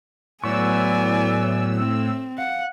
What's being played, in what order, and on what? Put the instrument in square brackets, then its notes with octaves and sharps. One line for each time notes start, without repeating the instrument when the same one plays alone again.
[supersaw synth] A2 E6 [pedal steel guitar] F#3 B3 C#6 [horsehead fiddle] D5 G#5
[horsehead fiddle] C4
[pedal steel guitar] F5 [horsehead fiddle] F#5